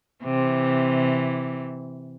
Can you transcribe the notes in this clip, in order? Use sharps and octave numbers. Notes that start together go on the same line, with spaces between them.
C3 E3